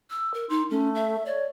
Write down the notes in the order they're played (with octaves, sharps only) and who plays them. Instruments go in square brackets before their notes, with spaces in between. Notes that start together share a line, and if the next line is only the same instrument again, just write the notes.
[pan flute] E6
A#4
[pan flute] D#4 [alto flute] C6
[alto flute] A3 [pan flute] C#4
[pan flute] E5
[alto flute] C#5 [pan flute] D5